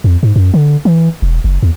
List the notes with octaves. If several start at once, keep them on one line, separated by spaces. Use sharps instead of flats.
F2
G#2
F#2
D3
E3
E1
F#1
E2